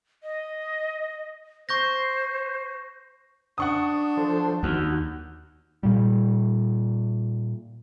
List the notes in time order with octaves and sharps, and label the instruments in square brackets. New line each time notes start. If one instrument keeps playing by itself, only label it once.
[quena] D#5
[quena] C5 [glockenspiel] C#6 G6 A#6
[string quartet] D4 [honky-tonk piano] F#5 C#6 D#6
[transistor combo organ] F3 A4 C5
[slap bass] D#2 [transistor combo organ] F#4
[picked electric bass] A#2 G3